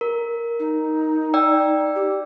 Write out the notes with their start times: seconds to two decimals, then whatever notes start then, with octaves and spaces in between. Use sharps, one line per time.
0.01 A#4
0.59 D#4
1.34 D5 G5 E6
1.95 G4